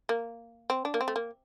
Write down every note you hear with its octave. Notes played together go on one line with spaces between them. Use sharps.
A#3
C4
D4
A#3
C4
A3
A#3